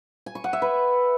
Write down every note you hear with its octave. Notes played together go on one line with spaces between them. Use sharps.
G#5
C#6
F#5
E5
B4